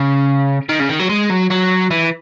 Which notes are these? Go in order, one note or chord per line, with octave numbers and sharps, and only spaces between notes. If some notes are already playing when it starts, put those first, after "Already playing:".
Already playing: C#3
D#3
C#3
D#3
F#3
G#3
F#3
F#3
E3